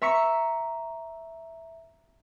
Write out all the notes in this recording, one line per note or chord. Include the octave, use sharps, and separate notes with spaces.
E5 A#5 C#6 B6 C#7